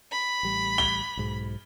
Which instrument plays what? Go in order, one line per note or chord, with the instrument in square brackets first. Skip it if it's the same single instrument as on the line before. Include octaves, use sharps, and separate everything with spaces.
[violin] B5
[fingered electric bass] A1 G3
[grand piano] G7
[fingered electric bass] B1 G#2